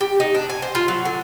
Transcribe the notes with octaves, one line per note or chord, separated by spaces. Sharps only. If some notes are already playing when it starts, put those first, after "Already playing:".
G4
D#4
D4
G#5
C5
F4
F#3
D3